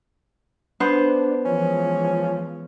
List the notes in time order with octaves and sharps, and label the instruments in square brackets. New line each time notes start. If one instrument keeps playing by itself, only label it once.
[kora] B3 C5 [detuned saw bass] D4
[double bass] E3 G#3 [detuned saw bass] F3 [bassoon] C#4